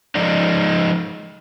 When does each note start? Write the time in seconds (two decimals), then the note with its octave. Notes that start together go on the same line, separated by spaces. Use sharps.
0.15 F3 G#3 D#4 D5